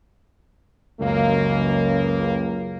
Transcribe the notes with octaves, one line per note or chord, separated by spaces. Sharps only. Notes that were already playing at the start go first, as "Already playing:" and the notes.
C#2 F#2 A#3